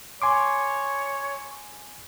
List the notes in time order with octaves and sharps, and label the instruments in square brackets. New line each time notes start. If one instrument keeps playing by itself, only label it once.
[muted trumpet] C#5 [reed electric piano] G#5 C6 D6